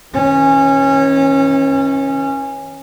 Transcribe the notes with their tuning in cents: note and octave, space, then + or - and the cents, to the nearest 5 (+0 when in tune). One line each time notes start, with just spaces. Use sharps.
E3 -45 C#4 -20